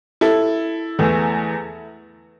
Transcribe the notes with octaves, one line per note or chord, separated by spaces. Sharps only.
E4 A4
E2 E3 A3